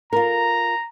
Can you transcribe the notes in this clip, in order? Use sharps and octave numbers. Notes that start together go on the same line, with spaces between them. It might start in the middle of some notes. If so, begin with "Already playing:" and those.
F4 A#4 A#5